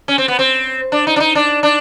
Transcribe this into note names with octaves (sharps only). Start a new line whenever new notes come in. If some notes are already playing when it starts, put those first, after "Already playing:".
C#4
C4
B3
C4
D4
D#4
D4
D#4
D4
D4